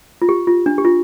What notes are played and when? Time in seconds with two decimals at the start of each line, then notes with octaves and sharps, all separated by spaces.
0.22 F4
0.29 G4
0.47 F4
0.66 D4
0.78 G4
0.85 F4